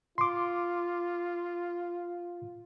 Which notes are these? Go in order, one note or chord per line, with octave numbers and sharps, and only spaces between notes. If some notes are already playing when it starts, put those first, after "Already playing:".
F4 C6 D6